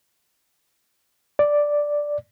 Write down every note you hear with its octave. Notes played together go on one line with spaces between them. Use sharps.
D5